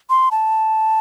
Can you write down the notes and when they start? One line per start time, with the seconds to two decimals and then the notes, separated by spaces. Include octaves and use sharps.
0.10 C6
0.31 A5